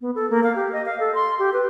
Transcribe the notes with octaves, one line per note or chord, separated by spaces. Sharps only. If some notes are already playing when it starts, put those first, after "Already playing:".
B3
A4
A#3
F5
G4
D#5
F5
A4
C6
G4
B4